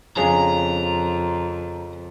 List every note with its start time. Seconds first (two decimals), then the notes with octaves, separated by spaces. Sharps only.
0.17 F2 C#3 D4 G#4 A#5